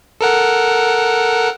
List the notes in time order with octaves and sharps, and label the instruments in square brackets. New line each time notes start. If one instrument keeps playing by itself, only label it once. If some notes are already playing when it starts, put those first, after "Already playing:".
[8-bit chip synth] A4 A#4 F#5